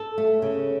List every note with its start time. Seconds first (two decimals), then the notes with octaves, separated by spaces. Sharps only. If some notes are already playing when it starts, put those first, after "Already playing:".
Already playing: A4
0.18 A3
0.42 C#3